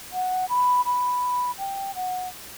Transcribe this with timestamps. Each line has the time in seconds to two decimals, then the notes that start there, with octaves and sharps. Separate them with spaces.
0.13 F#5
0.49 B5
0.85 B5
1.59 G5
1.95 F#5